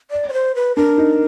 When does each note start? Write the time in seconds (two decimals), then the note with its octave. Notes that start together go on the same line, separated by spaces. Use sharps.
0.11 D5
0.28 C#5
0.33 C5
0.55 B4
0.76 D4 A#4
0.98 D#4